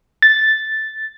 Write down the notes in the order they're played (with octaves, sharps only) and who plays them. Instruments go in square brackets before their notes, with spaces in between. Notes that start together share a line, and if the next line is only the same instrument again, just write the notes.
[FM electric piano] A6